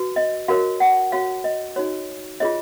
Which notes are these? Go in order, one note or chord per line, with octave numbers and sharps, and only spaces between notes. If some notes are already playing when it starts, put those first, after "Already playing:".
Already playing: F#4 B4
D#5
F#4 A#4 C#5 F5
F#5
F#4 C#5 F5
D#5
D#4 F#4 C#5
F4 G#4 C#5 D#5